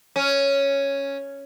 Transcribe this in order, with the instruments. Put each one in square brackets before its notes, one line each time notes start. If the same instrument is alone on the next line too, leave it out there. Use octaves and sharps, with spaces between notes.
[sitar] C#4